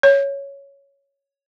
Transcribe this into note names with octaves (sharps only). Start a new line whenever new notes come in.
C#5